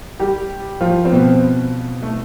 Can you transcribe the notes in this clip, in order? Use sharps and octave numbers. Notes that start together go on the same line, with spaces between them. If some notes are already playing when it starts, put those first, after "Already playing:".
G3 G4
F3 F4
C4
B2 B3
A3